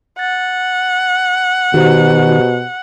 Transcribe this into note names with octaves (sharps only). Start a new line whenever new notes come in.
F#5 A6
B2 D#3 F#4 G4 C5 A#5